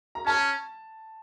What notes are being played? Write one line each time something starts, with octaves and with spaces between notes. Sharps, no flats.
A#5
C#4 A5